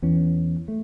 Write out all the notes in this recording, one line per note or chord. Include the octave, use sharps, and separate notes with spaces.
E2 E3 C#4
A3